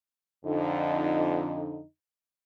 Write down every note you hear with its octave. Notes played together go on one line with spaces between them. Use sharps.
F2 D3 D#4